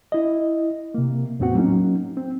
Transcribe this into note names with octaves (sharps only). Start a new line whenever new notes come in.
E4 D#5
C3 A#3
E2 A2 B3 C4 F#4 F#5
F#3 A#3 C#4 D#4
C4